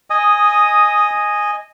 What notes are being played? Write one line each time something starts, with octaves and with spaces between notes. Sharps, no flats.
D#5 G#5 D#6